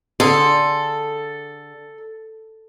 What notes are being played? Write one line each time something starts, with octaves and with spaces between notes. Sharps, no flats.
D3 G#4 A4 C6